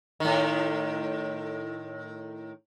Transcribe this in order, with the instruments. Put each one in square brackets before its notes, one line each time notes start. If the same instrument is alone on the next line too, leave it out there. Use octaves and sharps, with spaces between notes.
[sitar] A2 D#3